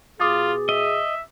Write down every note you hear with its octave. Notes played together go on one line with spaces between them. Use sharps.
B2 F4 G#4 D6 D#6 A6
D#5 E5